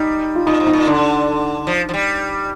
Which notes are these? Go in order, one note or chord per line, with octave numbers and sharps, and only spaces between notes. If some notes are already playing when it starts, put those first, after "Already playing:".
Already playing: G3 D#4
F4
A#2 D#4
G#2
D#4
A#2
D3 D4
F3
F3
G3